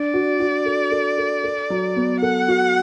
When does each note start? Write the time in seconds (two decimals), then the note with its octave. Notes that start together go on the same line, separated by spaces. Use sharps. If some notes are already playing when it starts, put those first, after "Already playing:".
Already playing: D4 D5
0.14 F#4
0.40 F#4
0.66 A4
0.91 A4
1.18 A4
1.44 A4
1.70 F#3
1.96 B3
2.22 A4 F#5
2.48 F#4